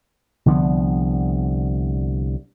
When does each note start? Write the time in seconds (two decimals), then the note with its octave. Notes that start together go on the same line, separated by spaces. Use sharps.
0.46 C2 D3 F3 B3